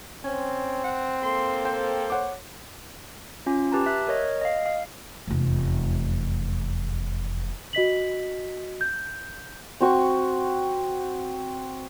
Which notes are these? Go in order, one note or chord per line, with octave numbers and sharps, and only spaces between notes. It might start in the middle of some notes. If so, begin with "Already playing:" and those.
C4 C#4
F#5
A#3 A4 C6
C5 G5
C#5 F#5 D6
C#4 F4
G4 B4 A5 A#5
E5 F#6
A#4 C#5 D#5
D#5 F5
F5
F1 E2
F#4 D#5 B6 F#7
G6
C4 F#4 C#6